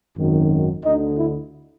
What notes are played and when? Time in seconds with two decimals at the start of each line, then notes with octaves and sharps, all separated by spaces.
0.17 G#1 F#2 D#3
0.83 D2 D3 D#4
1.17 E4